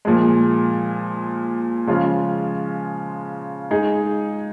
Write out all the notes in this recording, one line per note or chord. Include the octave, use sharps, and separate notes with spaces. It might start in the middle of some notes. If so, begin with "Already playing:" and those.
A#2 F3 G#3
C#3 F3 G#3 C#4 F4
G#3 D#4 G#4